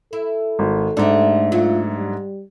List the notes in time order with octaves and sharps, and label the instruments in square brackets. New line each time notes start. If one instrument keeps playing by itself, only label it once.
[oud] E4 [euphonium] A4
[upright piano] G#1
[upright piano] G#2 D4 [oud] A3 G4
[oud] F#3 A3 [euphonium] F4
[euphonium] G3